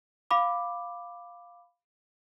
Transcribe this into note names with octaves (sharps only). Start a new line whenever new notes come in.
F5 B5 D6